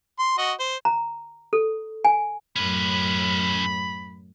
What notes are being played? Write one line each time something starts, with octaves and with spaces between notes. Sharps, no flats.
C6
F#4 D#5
C5
A#5
A4
G#5
F#2 A2 C#4 B4 B5